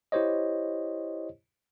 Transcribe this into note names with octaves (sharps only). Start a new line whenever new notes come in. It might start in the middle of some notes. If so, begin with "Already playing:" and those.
E4 G4 C5 C#5 D#5